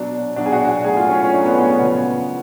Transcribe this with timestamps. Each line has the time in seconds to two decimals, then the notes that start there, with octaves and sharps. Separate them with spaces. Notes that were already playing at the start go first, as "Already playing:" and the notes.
Already playing: B2 F#3 D4
0.36 B2 F#3 D4
0.46 G#4
0.52 F#4
0.68 F#4
0.85 A2 F#3 G#4
0.97 F4
1.09 C#4
1.22 C#4
1.33 A2 F#3 D4
1.45 B3
1.57 C#4
1.70 B3
1.82 C#3 F3